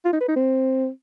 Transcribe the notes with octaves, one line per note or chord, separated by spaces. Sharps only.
F4
D#4
B4
D#4
C4